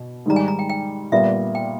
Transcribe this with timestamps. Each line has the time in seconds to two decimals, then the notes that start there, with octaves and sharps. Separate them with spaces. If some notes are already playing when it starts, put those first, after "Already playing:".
Already playing: B2
0.26 G#2 D#3 G3 A#5
0.36 G#5
0.48 A#5
0.59 G5
0.70 G5
1.12 A#2 G3 B3 E5
1.55 G5